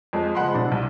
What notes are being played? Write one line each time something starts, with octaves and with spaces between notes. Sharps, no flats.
F2 G#3
F#1 F3 G#3 F#5 B5 C6
C3 D4
C2